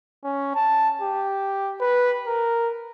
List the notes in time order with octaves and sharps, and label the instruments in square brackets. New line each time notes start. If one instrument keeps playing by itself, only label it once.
[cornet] C#4
A5
G4
B4
A#4